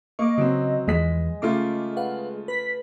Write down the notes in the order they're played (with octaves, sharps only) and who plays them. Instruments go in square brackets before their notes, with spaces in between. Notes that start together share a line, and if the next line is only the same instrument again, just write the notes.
[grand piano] A#3 [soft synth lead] D#5 [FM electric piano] C#6 D6
[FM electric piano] C#3 [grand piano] F#3 C4
[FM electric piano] E2 E3 F3 [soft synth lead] G#3 [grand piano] D#5 B6
[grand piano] C#3 A3 F4 [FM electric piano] D6
[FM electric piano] B4 F5 F#5
[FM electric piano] B4 [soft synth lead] B6